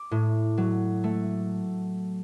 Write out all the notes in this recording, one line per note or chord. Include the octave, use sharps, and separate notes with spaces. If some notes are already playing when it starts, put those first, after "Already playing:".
Already playing: D6
A2
F#3
A3